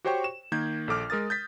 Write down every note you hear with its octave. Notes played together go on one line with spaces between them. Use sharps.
F#4 G4 C5 C#5 G5 C#6
E7
D#3 A#3 G6 G#6
A#1 A4 D6 F6
G#3 A#4 D#6 A6
G6 A6 B6